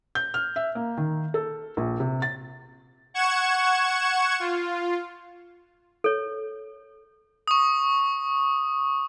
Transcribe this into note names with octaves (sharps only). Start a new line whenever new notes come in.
G6
F6
E5
A#3
D#3
A4
A#1
C3
A6
F#5 C#6 G#6 C#7 E7
F4
A4 C#5
C#6 D#6